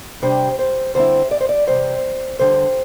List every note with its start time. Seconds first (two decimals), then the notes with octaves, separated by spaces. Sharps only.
0.22 C3 G3 D4 C5
0.59 C5
0.95 D3 G3 C4 E4 C5
1.31 D5
1.40 C5
1.49 D5
1.67 E2 C3 G3 C5
2.39 E2 D3 G3 D4 C5